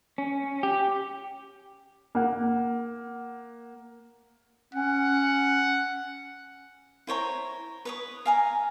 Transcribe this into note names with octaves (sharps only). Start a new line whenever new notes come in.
C#4
G4
A#3 F#5
C#4 F#5
E4 C5 C#5 A#5
B4 C#5 D#6
F5 G#5 A#5